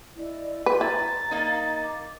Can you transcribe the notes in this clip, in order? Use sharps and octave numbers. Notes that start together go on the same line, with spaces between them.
E4 D5 D#5
F#4 B4 C6
E4 A#5 A6
A#3 D#4
D6